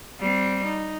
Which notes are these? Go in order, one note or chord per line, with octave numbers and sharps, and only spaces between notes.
G3 C4
D#4